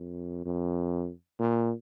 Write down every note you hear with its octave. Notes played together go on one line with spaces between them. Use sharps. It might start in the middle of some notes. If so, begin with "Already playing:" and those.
Already playing: F2
F2
A#2